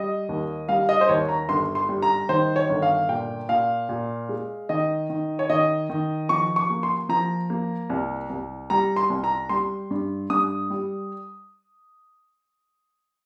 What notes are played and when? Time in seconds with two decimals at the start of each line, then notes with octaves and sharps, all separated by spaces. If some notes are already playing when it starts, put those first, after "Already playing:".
Already playing: G3 D#5
0.29 D#2
0.69 G3 F5
0.89 D#5
1.01 C5
1.09 D#2 C#5
1.29 A#5
1.49 G1 C6
1.75 C6
1.89 G3
2.02 A#5
2.29 D#3 C5
2.56 C#5
2.69 G1
2.82 F5
3.09 A#2 G5
3.49 A#2 F5
3.89 A#2
4.29 G#3
4.69 D#3 D#5
5.10 D#3
5.39 C#5
5.49 D#3 D#5
5.90 D#3
6.29 F3 C#6
6.56 C#6
6.69 A#3
6.83 C6
7.09 F3 A#5
7.50 A#3
7.90 C2
8.30 C2
8.70 G3 A#5
8.96 C6
9.10 C2
9.24 A#5
9.49 G3 C6
9.91 G2
10.30 G2 D#6
10.70 G3